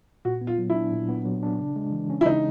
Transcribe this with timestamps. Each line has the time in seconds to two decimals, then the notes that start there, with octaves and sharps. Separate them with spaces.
0.25 A#2 F#4
0.41 B3
0.47 F4
0.58 F#3
0.70 E4
0.75 D4
0.92 A#2
1.09 B3
1.26 F#3
1.43 D4
1.59 C#3
1.76 G#3
1.92 E3
2.10 C#4
2.21 E4
2.26 C#3 D#4